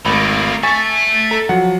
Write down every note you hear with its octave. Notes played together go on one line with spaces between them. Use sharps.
G#1 A3 A#3 B5
E5 G#5 A5 C#6 A6
A4 A#5
F3 F#3 F#5